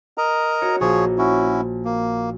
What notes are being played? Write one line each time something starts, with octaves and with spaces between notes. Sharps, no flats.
A#4 D#5 A#5
F#4 C#5
A#1 F3 G#4 C#5
C#4 E4 F#4
A#3